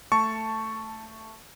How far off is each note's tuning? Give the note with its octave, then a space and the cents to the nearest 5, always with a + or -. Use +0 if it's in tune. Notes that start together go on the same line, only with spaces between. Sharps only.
A3 +10 A5 +0 C#6 +0